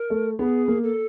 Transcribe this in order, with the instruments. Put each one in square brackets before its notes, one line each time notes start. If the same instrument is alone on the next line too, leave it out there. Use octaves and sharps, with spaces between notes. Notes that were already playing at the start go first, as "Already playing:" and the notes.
Already playing: [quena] A#4
[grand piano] A3
[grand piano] B3 [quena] G#4
[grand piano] A#3
[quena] A4